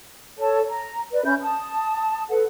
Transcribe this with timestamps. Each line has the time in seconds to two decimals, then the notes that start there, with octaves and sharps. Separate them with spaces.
0.38 A4 C#5 A5
0.69 A#5
1.11 B4 D5
1.25 C#4 E5 B5 G6
1.41 A5 D#6
2.30 A4 B4 F#5